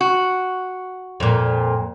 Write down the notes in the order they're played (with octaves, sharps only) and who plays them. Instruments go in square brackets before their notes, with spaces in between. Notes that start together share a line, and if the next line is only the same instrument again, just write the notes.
[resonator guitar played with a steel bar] F#4
[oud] F2 A#2